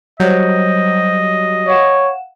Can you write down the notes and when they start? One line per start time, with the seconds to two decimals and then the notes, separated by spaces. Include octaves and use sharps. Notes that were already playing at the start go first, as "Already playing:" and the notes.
0.20 F#3 G3 C5 C#5 D#5 G6
1.68 C#5 F5 F#5 E7